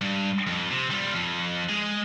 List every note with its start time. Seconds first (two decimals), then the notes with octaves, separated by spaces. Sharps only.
0.01 G2
0.47 F2
0.71 C3
0.91 G3 F4
1.15 F2
1.69 G#3 G#4